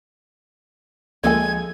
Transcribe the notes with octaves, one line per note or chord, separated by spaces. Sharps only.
D2 F3 G#3 A#3 A4 G#5 G#6